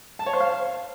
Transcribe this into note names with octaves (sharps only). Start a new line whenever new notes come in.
A5
C#5
C5
F5